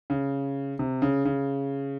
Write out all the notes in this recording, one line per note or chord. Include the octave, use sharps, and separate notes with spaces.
C#3
C3
C#3
C#3